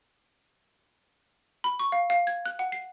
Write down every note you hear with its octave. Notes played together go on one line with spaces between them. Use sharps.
B5
C#6
F5
F5
G#6
F#6
F#5
C7